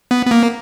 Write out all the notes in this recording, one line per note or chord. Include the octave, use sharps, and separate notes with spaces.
B3
B3
A#3